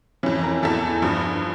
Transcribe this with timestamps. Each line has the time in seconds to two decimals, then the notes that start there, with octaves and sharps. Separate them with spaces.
0.23 F2 E3 C#4
0.43 A#4
0.63 E2 E3 A4
1.02 G2 F3